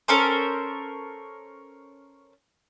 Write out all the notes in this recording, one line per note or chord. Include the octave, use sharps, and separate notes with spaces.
C#4 A4 A#4 C5